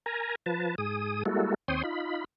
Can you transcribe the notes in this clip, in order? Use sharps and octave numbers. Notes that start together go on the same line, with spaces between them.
A#4 G#5 A#5
F3 B4 A5
G#2 G#4 D#6
G3 G#3 A#3 E4 F#4 A4
D#2 C4 C#5 G5 C6 D#6
D#4 F4 B5